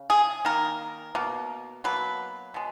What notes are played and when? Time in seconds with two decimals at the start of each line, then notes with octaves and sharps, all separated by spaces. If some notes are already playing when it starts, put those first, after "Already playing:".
Already playing: C#3
0.10 G#4
0.45 D#3 A#3 A#4
1.15 B2 A#3
1.84 B2 F#3 A#3 B4
2.54 B2 G#3